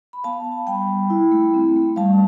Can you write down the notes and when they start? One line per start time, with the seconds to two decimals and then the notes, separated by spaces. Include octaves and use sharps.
0.13 B5
0.24 B3 F5 A5
0.46 B3
0.67 G3 G5 B5
0.89 G3
1.10 E4
1.32 A3
1.54 C4
1.76 A3
1.96 G3 F5 A5